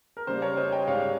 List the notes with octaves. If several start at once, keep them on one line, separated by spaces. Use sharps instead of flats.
A#4
C#3 G3 A#3 C5
A#4 C#5
C5 D#5
D#5 G5
G#2 G3 C#4 C#5 F5